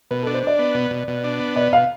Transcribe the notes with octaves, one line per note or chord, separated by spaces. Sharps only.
B2 B4
A4
D4
C5
D4 D5
B3
B2
B2
B2
D4
B3
B2 D5
B2 F5